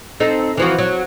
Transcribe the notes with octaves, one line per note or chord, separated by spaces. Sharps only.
C4 D#4 A4
E3 F3 F#4
F#3